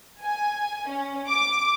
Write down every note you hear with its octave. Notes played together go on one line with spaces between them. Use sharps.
G#5
C#4
D6